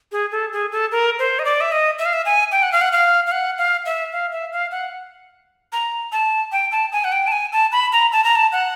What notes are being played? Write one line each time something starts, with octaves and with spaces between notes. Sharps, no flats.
G#4
A4
G#4
A4
A#4
C5
D#5
D5
E5
D#5
E5
F5
E5
G#5
G5
F#5
F5
F#5
F5
F5
F#5
F5
E5
F5
E5
F5
F#5
A#5
A5
G5
A5
G#5
F#5
G5
A5
G#5
A5
B5
A#5
A5
A#5
A5
F#5